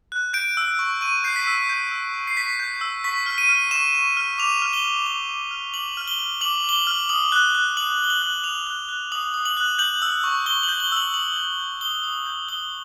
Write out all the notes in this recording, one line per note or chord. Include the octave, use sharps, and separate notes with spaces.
F#6
G6 D7
E6
C#6
C#6 D#7
G6 C7
B6
E6
G6
E6
C#6
C7
C#6 B6
G6
E6
C#6 B6
F6
D#7
F6
C#6 E7
C#6
F6
D6 F7
F6
G7
F6
D6 G7
D6
F6
D6 F#7
F6
G7
F6
D6 F#7
D6 G7
F#7
F6
D#6 F#7
F#6
F#6
D#6 F#7
D#6
G7
F#7
F#6
D#6 F7
F#6
F#6
D#6 F#7
D#6
F#7
F#6
G6 F#7
E6
C#6
C#6 G7
F#7
G6
G7
E6 F#7
D#6 F#7
G6
G6
D#6 G7
D#6
G6
D#6 G7